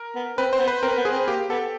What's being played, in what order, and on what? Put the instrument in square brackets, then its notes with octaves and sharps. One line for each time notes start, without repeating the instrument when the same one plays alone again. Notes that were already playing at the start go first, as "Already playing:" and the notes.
Already playing: [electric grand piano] A#4
[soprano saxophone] B3
[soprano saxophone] C4 [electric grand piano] B4
[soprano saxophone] C4 [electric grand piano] C5
[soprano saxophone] B3
[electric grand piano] B4
[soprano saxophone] C4 [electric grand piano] A#4
[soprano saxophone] B3
[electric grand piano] G#4
[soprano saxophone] C4
[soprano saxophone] A#3 [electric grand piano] G4
[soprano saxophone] B3 [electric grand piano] A4